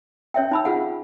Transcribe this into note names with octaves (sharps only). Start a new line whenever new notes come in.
C#4 C#5 E5 G5
D#4 B5 E6
F4 G#4 F#5